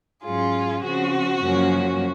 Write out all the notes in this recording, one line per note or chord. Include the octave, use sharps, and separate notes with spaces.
G#2 F#3 C#4 F4 G#4
C#3 F3 C4 F#4
F#2 C#3 F3 A#3 C#4